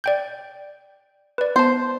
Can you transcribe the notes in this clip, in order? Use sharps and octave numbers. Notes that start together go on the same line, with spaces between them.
D5 G5 G6
B4 D5
B3 C5 A5